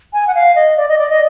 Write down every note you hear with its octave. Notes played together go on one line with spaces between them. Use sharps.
G#5
F#5
F5
D#5
D5
D#5
D5
D#5